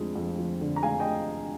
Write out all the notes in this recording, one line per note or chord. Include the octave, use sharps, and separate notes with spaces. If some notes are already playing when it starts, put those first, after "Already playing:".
Already playing: F2 D3 F3 G#3
F2
F3
D3
A#5
G#3 F5 G#5
D#5 G5